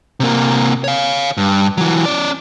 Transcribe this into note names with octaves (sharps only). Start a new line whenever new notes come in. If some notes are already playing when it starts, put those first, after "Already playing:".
C3 A#3
C#5 F5
G2
E3 F#3
C#4 D5